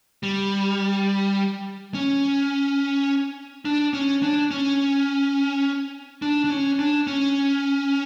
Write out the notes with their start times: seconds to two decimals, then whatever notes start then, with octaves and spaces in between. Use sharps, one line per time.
0.23 G3
1.94 C#4
3.65 D4
3.94 C#4
4.23 D4
4.51 C#4
6.22 D4
6.44 D4
6.50 C#4
6.79 D4
7.07 C#4